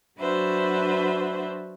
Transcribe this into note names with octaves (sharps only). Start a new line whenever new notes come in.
F#3 D4 F#4 B4 C5 E5